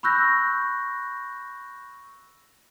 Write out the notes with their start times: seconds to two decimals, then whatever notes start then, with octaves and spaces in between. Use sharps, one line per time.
0.03 B5 C#6 E6 F#6 G6 A#6